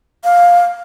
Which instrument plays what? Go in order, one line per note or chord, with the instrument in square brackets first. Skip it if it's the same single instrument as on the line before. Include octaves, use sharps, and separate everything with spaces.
[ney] F5